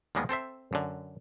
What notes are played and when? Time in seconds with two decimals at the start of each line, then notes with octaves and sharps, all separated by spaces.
0.15 D#2 G3 G#3 A#3 B3
0.29 C4 A4 C5 E5
0.73 F#2 D3